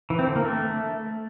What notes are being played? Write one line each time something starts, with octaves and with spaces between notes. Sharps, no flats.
E3
C4
D3
A#3
A3